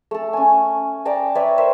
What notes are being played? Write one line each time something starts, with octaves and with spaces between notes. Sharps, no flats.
A3 A4
C#4 G#5
D5 G5 A5 A#5
B4 C#5 D5 E5
A#4 C5 E5